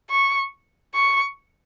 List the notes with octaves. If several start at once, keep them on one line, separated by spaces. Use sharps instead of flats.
C#6
C#6